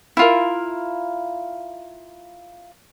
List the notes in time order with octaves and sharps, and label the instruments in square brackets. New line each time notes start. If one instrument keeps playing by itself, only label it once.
[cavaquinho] E4 F4 A#4